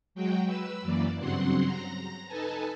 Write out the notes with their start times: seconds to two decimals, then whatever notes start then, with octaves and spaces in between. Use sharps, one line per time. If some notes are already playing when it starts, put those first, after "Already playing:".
0.15 F#3 G#3 F#4 G5
0.45 B4 E6
0.82 F#2 E3 A#3 D5
1.19 G2 C#3 F#3 C4 F#5 C6
1.65 A#5 A#6
2.27 D#4 A4 B4 G#5 A5